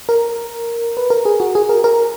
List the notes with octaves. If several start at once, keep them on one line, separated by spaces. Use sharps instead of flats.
A#4
B4
A#4
G#4
F#4
G#4
A#4
A#4